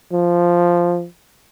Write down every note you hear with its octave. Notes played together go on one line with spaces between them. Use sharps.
F3